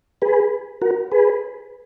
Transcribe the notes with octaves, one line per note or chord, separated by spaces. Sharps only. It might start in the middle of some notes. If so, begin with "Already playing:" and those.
G#4 B4
F#4 A#4
G#4 B4